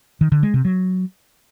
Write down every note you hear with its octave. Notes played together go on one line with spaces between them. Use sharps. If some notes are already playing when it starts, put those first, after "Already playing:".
D#3
D3
G#3
C3
F#3